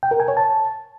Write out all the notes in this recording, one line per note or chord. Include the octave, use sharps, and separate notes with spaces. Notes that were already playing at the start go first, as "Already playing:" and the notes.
G5
A#4
G#5
C#5
A5